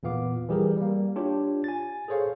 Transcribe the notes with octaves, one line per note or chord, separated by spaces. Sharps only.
E2 A#2 B3 F5 D6
E3 G3 G4 G#4 A#4
G3 A#3
D4 F4 G4 C#5
G#5 A6
G#4 A4 C5 C#5 F5